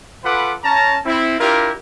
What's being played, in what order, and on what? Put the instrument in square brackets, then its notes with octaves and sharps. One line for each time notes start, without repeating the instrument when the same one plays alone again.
[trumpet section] F4 A4 B4 F#5 B5 D6
C#4 A5 A#5
C4 E4
D4 E4 F4 G4 A#4